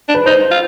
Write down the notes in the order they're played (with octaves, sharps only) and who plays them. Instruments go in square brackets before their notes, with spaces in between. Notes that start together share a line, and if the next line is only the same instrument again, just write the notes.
[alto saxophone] D4
[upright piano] B4
[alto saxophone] D#4 [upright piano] C5
[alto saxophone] F4